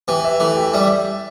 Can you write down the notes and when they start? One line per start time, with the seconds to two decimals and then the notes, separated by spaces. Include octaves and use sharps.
0.08 E3 G4
0.24 E5
0.40 E3 A3
0.57 G4
0.73 G3 E5